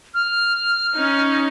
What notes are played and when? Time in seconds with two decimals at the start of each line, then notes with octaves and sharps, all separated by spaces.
0.14 F6
0.96 C#4 D#4